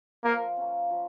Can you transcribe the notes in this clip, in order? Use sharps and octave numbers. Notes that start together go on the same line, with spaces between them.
F3 A#3
A#3 C#4
F3